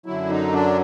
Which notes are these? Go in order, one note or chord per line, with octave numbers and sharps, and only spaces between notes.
F#2 D3 F#3 E4
D#4
D4